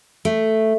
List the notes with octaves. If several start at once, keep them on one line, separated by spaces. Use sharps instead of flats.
A3